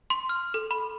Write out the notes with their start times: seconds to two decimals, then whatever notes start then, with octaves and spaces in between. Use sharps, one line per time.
0.10 C6
0.29 F6
0.54 A4
0.71 B5